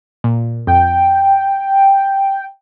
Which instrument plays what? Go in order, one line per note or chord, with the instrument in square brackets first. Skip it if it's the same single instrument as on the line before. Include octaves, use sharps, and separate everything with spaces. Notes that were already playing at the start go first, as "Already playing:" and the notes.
[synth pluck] A#2
[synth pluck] F2 [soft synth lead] G5